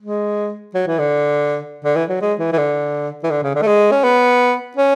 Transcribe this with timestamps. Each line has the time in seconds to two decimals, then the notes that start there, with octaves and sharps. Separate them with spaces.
0.02 G#3
0.75 F#3
0.87 E3
0.99 D3
1.84 D3
1.96 E3
2.09 F#3
2.21 G#3
2.39 E3
2.52 E3
2.58 D3
3.24 E3
3.31 D3
3.43 C#3
3.55 D3
3.62 A3
3.67 G#3
3.92 C#4
4.04 B3
4.76 C#4